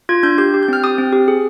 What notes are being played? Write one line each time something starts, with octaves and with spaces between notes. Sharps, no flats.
F4 G#6
D4 G6
G4 G6
G4
G6
C4 F6
G4 D#6
C4
G4
G#4